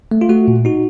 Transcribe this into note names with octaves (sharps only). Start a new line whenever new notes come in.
A3
F4
A3 F#4
A#2
D#4 F#4